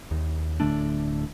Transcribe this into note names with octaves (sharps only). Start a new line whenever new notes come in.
D#2
D1 D3 A3 D4